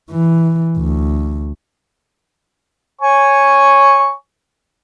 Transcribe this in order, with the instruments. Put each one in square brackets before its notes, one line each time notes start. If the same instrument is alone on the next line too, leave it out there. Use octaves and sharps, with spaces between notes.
[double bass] E3
D2
[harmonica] C#5 G#5 C#6